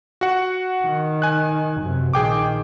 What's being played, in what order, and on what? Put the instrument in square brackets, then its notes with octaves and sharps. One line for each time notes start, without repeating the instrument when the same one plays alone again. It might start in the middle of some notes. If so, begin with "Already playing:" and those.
[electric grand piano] F#4 F#5
[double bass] D#3
[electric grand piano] G#5 F#6
[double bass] F#2 C3
[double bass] A#1 D#3 [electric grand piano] G#4 G5 D6